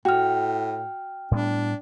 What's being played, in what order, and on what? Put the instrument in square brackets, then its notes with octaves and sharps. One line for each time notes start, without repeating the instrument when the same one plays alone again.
[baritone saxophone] A2 [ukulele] F#4 [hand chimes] G5 F6
[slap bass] A2 G3 B3 [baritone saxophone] D4